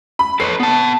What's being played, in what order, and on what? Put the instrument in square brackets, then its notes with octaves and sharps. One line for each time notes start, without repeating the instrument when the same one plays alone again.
[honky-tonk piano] B5
[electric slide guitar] A4 B4 C#5 [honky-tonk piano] C7
[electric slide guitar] B3 A5